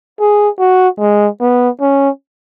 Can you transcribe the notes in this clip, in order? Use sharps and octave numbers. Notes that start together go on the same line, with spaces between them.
G#4
F#4
G#3
B3
C#4